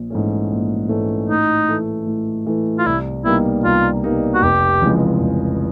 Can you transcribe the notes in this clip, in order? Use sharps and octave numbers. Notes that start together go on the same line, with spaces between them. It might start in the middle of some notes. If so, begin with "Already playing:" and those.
Already playing: A#1
G#2 E3 A3 C#4
A#1
G#2 E3 A3 C#4
A2 D#4
E3 A3
A2
E3 A3
F4
C2 E4
B2 G3 A#3 D#4 E4
C2 F4
B2 G3 A#3 D#4
F#4
F1 G4
F2 C#3 E3 G#3
F1